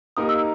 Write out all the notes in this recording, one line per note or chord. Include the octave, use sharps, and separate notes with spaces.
A#3 D#4 G4 A#4 D#6
E6